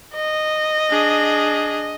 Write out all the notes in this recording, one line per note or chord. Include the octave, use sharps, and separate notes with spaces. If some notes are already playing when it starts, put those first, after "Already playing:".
D#5
D4 G#4